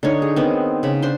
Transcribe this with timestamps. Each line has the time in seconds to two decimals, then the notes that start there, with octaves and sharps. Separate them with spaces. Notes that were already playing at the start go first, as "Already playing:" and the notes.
0.03 D3 D#4 C#5
0.22 G#4
0.36 D#3 B3 C4
0.83 C#3 B5
1.02 D4 C5 C6